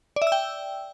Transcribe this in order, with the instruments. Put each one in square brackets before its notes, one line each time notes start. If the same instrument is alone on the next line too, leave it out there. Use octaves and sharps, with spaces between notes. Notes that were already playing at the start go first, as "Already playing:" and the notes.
[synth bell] D5
E5
E6
G5